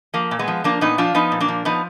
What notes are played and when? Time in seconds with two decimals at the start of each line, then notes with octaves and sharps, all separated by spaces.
0.14 F3 A#3
0.31 A#2
0.39 G#3 B3
0.48 F3
0.64 F3 A#3 D4
0.81 A#2 B3 D#4
0.98 F3 D4 F4
1.14 F3 B3 D#4
1.32 A#2
1.40 A#3 D4
1.48 F3
1.65 F3 B3 D#4